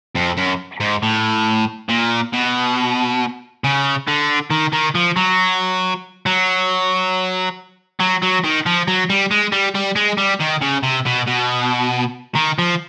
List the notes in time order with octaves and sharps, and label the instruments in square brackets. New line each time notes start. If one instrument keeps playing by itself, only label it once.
[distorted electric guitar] F2
F#2
G#2
A2
A#2
B2
C#3
D3
D#3
D#3
F3
F#3
F#3
F#3
F#3
D#3
F3
F#3
G3
G#3
G3
G3
G#3
G3
D#3
C#3
C3
B2
B2
D#3
F3